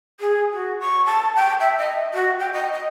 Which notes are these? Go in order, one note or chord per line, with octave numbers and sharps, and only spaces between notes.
G#4
F#4
C#6
A5
G5
E5
D#5
F#4
G5
D#5
D#5